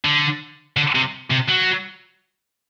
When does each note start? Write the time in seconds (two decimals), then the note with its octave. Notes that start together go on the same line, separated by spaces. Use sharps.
0.05 D3
0.77 D3
0.95 C3
1.30 C3
1.48 F#3